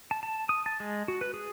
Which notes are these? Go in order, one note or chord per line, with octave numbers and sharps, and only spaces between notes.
A5
A5
D#6
A5
G#3
F#4
B4
G#4